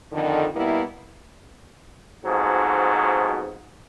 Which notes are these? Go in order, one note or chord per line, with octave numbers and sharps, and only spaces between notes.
F2 D3 D#3
B2 G3 A#3 B3 E4
F2 G#2 B2 F#3